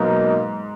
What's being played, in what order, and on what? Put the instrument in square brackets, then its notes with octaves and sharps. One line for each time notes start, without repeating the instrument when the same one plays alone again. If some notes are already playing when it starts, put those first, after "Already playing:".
Already playing: [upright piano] G#2 [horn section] B2 F#3 A#3 D#4